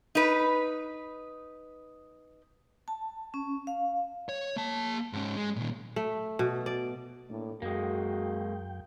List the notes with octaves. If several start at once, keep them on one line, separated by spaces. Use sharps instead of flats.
D#4 B4
A5
C#4
F5
C#5
A#3 A5
G#2 C#4
G#3
A#2 D#3
A3
B2
D5
A2 A#3 D4
F#2 G#3 A#3 F#4 G5